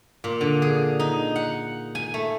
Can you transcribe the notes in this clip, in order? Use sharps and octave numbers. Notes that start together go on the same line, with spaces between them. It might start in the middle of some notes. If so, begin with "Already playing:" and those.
A#2
D3
G#4
D#4
F#5
G#5
A3